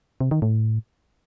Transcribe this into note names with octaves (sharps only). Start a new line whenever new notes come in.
C3
D#3
A2